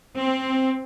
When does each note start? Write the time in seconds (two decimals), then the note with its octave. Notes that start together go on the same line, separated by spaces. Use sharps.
0.16 C4